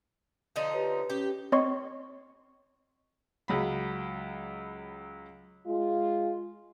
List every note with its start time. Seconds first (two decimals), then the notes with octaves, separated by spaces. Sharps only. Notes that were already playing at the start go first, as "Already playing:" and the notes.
0.56 D3 F3 D#4
0.73 G4 B4 C#5
1.10 C#4 G4
1.52 C4 C#5 D#5 C6 C#6
3.48 C#2 F#3 B5
5.67 G#3 F4